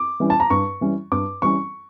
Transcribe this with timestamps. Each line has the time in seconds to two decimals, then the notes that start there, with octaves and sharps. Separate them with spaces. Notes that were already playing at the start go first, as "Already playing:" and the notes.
Already playing: D6
0.20 E3 G3 C#4
0.30 A5
0.40 A#5
0.50 G2 C#6
0.81 E3 G3 C#4
1.12 G2 D6
1.42 E3 G3 C#4 C#6